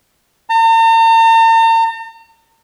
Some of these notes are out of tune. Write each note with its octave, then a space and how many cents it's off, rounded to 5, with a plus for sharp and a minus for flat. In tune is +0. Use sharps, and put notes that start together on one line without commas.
A#5 -45